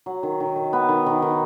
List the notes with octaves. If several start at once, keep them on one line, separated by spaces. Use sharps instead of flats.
F#3
D#3
D#3
D#3
B3
D#3
D#3
D#3